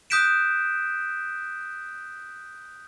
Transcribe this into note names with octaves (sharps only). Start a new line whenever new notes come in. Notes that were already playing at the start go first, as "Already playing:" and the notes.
D#6 F#6 G6 B6 D7 E7